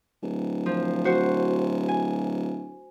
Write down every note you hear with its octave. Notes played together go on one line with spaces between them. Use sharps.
D1
F3
F#4 C5
G#5